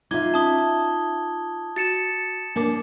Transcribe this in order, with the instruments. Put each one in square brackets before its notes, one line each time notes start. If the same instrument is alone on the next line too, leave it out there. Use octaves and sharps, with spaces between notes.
[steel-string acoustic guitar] D#4 F4 E5 [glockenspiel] D6 G#6 G7
[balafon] C#4 [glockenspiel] A5 D#6 G7
[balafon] F#4 [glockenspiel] A6 C#7 E7
[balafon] A#3 A#4 D6 [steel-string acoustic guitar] D4